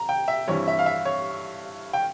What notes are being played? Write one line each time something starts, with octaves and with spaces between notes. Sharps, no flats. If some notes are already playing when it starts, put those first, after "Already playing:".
Already playing: A#5
G5
E5
G2 E3 G3 C4 E4 C#5
E5
F5
E5
C#5
G5